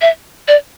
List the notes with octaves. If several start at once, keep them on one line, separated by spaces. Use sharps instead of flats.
E5
D5